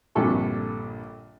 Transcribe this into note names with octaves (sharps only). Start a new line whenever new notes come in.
A#1 G2 D3 C4 A4 C#6